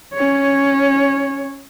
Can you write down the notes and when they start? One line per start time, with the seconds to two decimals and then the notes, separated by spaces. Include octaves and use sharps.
0.14 C#4 C#5